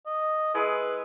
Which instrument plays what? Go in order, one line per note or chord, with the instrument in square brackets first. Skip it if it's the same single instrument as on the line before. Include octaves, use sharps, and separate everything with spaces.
[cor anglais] D#5
[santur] G#3 E4 G#4 [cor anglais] B4